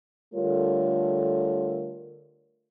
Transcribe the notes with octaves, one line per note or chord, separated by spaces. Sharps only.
D3 G3 A3 F4 A#4 C#5